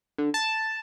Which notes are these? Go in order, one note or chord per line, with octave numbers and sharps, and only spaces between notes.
D3
A5